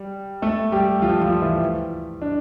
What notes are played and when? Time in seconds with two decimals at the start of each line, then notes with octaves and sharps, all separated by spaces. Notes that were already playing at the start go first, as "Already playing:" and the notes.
Already playing: G3
0.42 A3 A4
0.72 G3 G4
1.02 F3 F4
1.21 F3 F4
1.42 E3 E4
2.22 D4